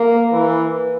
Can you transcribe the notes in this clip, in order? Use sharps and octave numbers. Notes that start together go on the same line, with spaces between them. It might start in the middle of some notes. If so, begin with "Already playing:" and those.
Already playing: A#3
E3